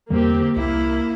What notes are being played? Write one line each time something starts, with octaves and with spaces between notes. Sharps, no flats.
E2 D3 G3 A#3 C4 G4
C2 A#3 E4